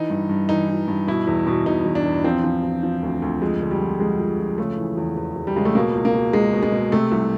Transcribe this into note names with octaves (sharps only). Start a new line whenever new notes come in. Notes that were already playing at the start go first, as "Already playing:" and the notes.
Already playing: E3 D#4
G2
G2
E3 D#4
E3
G2
B2 E4
E2
B2
B2 D#4
E2
D4
E2
F3 C4
F3
F3
F3
D2
D2
F2 G#3
D3
G3
F2
F2 G#3
F2
F2
C#3 A3
E3
E2
E2
E2
G3
C#3 G#3
A3
B2 A#3
C#2
A#3
B2
C#2 G#3
B2
G#3
B2
C3 A3
C2